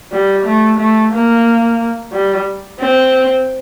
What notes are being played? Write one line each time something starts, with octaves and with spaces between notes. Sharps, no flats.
G3
A3
A3
A#3
G3
C4